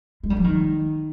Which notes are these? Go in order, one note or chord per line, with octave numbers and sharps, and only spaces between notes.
G#3
G3
F3
D#3